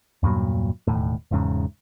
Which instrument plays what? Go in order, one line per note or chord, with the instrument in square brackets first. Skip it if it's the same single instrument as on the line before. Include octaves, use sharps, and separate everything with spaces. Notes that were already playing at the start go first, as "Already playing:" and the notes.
[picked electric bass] E2 G2 A#2 F#3
E1 D#2 A2
E1 E2 G#2 C#3